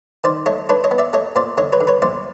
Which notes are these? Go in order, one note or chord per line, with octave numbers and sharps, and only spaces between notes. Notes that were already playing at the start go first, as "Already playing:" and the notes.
D#3 C5 D5
A3 C#5 D#5
D4 B4 C#5
C#5 D#5
B3
D5 E5
A3 C#5 D#5
A#2 C5 D5
D3 C#5 D#5
B4 C#5
D3
B4 C#5
A#1 C5 D5